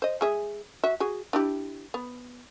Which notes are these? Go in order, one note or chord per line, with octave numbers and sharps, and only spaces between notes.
C5 D#5
G#3 G#4 E5
F#4 E5
F#4 G#4
D4 E4 G4
B3